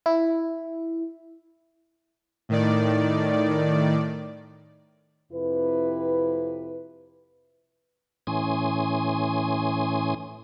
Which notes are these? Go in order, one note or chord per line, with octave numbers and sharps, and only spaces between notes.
E4
A2 D#3 D5
F2 C3 E4 B4
A2 E3 C#4 G#5 C6 D#6